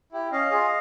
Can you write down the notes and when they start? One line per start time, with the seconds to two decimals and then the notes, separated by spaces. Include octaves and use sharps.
0.12 E4 G4
0.32 C#4 D#5 F5
0.51 F4 G#4